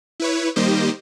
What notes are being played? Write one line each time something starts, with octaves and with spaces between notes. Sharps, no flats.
E4 B4 C#5
D#3 G3 A#3 G4 C5 D#5